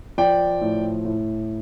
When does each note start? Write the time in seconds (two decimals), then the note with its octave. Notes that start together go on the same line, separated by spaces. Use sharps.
0.18 F3 D5 G5
0.61 A2
1.05 A2